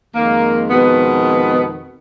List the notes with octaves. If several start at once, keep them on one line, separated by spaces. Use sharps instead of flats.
F2 D#3 G#3 A#3
B2 B3